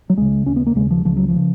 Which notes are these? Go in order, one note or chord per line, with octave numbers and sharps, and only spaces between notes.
F#3
C#2 C#3 G#3
D#2 C#3 C#4
B3
A#3
D#2 C#3 G#3
F3
C#2 C#3 F3
F#3
F3
C#3